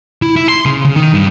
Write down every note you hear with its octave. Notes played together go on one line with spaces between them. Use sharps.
E4
E4
C6
C#3
C#3
D#3
G2